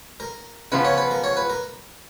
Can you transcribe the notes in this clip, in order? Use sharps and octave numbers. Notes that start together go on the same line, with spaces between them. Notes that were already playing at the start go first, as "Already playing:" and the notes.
A#4
C#3 F3 B3 F4 B4
C#5
B4
A#4
C#5
B4
A#4